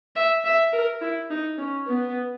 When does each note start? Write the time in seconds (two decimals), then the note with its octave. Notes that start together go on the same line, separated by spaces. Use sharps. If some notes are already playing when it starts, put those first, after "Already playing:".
0.16 E5
0.45 E5
0.73 A#4
1.01 E4
1.30 D#4
1.58 C#4
1.87 B3